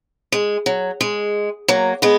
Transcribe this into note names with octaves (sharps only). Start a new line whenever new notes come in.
G#3
F#3
G#3
F#3 A#3
G#3 B3